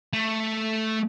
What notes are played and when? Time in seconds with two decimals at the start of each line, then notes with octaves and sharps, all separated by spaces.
0.13 A3